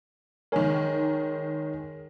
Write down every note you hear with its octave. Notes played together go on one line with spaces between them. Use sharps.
D#3 G#3 A#4 C#5 G#5